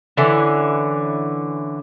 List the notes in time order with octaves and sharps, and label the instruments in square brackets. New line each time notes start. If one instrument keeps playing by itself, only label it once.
[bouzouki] D3 E3 C#4